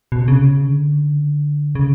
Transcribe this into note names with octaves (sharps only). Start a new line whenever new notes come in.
B2
C3
C#3
D3
C#3